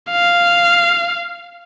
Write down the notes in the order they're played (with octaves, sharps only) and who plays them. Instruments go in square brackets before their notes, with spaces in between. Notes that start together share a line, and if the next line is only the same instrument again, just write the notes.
[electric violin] F5